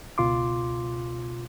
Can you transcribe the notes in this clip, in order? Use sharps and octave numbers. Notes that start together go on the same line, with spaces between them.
C#2 B2 F4 C6 D6